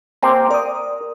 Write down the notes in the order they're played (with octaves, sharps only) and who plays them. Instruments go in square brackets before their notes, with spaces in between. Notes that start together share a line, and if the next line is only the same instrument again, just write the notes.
[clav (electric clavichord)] A#3 C4 G4 [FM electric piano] A#5 C6 D6
[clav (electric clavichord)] A#4 [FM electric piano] D5 D#6